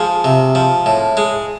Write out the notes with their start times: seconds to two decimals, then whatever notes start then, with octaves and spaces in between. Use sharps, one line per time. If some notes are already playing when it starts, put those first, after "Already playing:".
Already playing: F3 G#3 G#4
0.24 C3
0.55 F3
0.86 A2
1.17 G#3